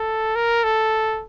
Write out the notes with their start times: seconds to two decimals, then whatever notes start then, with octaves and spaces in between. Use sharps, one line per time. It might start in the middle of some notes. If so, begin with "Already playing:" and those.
Already playing: A4
0.35 A#4
0.64 A4